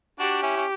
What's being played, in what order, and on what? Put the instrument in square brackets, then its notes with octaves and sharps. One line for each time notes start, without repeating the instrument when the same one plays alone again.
[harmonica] D4 F#4 [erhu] G4
[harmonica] C#4 E4
C#4